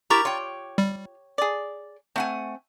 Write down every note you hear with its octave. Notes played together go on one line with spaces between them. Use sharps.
E4 G4 A#4 A#5 C#6 A6
F4 C#5 G5
G3
G#4 D5
A3 C4 F#5 G#5